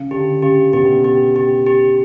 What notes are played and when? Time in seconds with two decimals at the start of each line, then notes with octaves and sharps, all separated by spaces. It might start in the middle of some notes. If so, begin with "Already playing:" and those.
Already playing: C#3
0.11 D3 G4
0.42 C#3 G4
0.73 B2 G4
1.04 G4
1.36 G4
1.66 G4